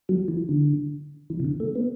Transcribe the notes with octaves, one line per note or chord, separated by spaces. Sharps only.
F#3
E3
D3
E3
C3
D3
A3
B3